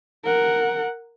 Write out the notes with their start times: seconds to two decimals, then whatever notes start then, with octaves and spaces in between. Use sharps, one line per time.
0.25 A#4 F#5